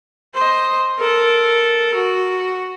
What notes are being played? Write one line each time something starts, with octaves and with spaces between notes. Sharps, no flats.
C5 D#5
A4 A#4
F#4